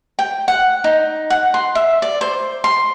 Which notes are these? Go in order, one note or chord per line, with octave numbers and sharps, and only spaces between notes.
G5
F#5
D#4
F#5
C6
E5
D5
C5
C6